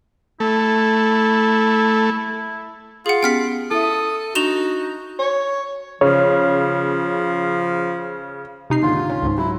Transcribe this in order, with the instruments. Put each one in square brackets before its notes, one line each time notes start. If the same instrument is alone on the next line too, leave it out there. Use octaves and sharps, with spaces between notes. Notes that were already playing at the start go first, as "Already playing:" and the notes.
[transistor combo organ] A3 [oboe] E4
[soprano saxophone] F4 [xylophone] G#4 F#5
[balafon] B3 C#4 G4 [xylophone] G5 F6 B6
[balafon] E4 E5 [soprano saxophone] A4 [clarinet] D#6
[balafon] D4 [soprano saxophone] D#4 [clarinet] F#4 [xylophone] E7 F7 G7
[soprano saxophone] C#5
[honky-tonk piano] C#3 [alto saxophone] F3 [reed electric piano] C#5
[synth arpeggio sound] C3 D#4 C7
[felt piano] D#2 G#2 D3 [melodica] F4
[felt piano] C#4
[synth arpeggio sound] C#2 G#2
[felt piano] F#3 [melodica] E4